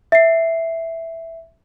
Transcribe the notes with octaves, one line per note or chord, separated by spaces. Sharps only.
E5 C7